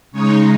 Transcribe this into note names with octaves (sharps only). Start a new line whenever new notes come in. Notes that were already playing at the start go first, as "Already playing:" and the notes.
C#3 G#3 D#4 C#5